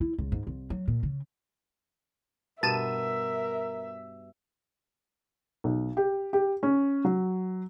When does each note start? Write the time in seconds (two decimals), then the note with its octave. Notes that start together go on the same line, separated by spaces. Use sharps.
0.01 E4
0.18 C#2
0.32 G#2
0.47 C2
0.70 F#3
0.88 A#2
1.03 C#3
2.63 G2 B2 A#4 E5 A5 D#7 E7
5.64 B1
5.97 G4
6.33 G4
6.63 C#4
7.05 F#3